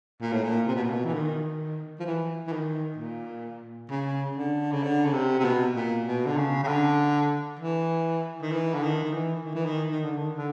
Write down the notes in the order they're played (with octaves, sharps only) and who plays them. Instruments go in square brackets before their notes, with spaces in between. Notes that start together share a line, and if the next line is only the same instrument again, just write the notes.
[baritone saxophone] A#2
A2
A#2
C3
B2
A#2
B2
E3
D#3
F3
E3
E3
D#3
A#2
C#3
D3
C#3
D3
C#3
C3
C3
B2
A#2
B2
D3
C#3
C#3
D3
E3
D#3
E3
D3
D#3
D#3
E3
D#3
E3
D#3
D#3
D3
D#3
D3